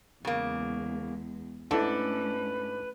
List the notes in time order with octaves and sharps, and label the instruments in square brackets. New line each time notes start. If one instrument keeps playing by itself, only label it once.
[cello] E2 G#3 [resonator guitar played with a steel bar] C#3 A#3
[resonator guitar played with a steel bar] G#2 D4 [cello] A3 C#4 [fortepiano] E4 A4 [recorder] B4